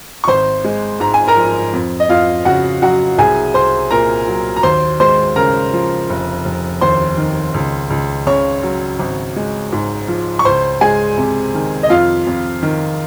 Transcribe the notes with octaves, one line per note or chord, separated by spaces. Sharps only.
C#6
G#1 C5 C6
G#3
G#2 A#5
G#5
A#4 A#5
F3
F2
D#5
F2 F4 F5
C#3 F#4 F#5
F#3 F#4 F#5
C2 G#4 G#5
C2 C5 C6
A#2 A#4 A#5
F#3
A#5
D#2 C5 C6
G#3 C5 C6
C#3 A#4 A#5
F3
F1
F1
D#2 C5 C6
D#3
C#2
C#2
C#3 C#5 C#6
F#3
G#1
G#3
G#2
F3
C#6
C#2 C5 C6
G#3 G#4 G#5
C3
D#3
D#5
F2 F4 F5
F2
D#3